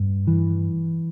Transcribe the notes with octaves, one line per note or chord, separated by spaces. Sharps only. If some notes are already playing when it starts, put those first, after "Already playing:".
Already playing: G2
E3